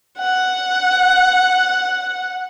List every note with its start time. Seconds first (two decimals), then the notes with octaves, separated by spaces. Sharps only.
0.18 F#5